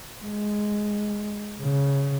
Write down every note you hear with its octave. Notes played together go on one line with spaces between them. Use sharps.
G#3
C#3